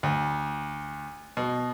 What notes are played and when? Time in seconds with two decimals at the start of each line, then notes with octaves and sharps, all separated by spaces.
0.03 D2
1.37 B2